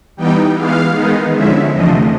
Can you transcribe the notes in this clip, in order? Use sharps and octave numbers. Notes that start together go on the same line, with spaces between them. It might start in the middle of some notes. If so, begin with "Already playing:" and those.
E3 G3 B3 D#4 G5
E3 G#3 B3 F5
D#3 G#3 B3 D#4
D3 F3 G#3 C#4 E4 E5
E2 C3 F3 A3 D4 D#5